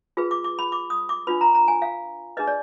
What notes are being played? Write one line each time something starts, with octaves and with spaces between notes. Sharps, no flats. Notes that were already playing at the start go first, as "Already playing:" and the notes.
F4 G#4 B4
D6
D6
B5
D6
D#6
D6
D4 F4 B4 B5
A#5
A#5
G#5
F5
D4 G#4 B4 D#5
D5